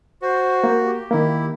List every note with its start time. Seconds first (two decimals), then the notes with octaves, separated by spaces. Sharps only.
0.22 F#4 C5
0.64 A#3
0.83 G4
1.11 D#3 A#3 E4